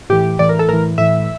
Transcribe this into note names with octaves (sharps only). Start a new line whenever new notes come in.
A2 E3 G4
A2 E3 D5
A#4
A4
A2 E3 A#4
A2 E3 E5